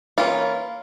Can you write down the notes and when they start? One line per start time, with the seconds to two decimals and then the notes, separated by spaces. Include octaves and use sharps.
0.18 E3 A#3 C#4 F4